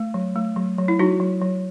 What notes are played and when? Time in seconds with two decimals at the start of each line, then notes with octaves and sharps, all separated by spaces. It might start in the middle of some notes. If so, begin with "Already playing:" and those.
Already playing: A3
0.14 F#3
0.36 A3
0.56 F#3
0.78 F#3
0.88 E4
0.99 F#3 D#4 F#4
1.20 F#3
1.42 F#3